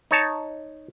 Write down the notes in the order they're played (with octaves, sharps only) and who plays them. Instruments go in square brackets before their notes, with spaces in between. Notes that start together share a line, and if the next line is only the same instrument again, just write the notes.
[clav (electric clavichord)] D#4 C#5 A5